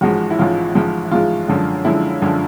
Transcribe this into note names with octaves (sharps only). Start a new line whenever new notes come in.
A1 G#2 F3 G#3 F#4
E4
A1 G#2 F3 G#3 F4
A1 G#2 F3 G#3
A1 G#2 F3 G#3 F4
F#2 D3 F3 G#3
F#2 D3 F3 G#3 E4
F#2 D3 F3 G#3